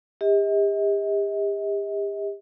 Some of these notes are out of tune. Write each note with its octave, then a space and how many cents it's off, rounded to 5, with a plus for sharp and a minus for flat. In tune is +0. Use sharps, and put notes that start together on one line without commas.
G4 +40 D#5 +40